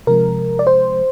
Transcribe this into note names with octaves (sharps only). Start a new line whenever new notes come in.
C3 F3 G#3 A#4
D5
C5